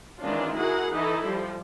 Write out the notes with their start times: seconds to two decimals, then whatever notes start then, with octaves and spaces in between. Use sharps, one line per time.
0.20 D#3 E3 G#3 C#4 D4 F4
0.56 E4 F#4 G#4 A#4 F#5
0.92 E3 D#4 E4 A4
1.25 F3 G3